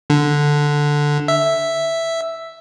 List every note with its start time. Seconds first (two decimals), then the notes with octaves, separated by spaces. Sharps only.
0.10 D3
1.28 E5